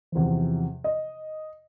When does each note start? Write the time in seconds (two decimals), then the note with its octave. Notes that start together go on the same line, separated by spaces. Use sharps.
0.12 E2 C3 F3
0.84 D#5